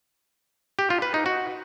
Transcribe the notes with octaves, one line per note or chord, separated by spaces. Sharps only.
G4
F4
B4
D#4
F#4